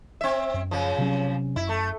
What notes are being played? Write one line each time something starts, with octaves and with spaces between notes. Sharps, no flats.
C4 E5
F#2
C#3 F3
C3 F#3 C#4
F#2 E4
A3